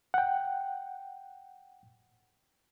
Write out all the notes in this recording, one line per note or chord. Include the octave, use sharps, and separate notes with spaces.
F#5 G5